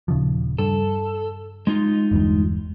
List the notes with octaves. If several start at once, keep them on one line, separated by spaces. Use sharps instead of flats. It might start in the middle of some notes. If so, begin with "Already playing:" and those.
D#1 C#3 F3
G2 A4
G#3 D#4 F4
G1 E2 G2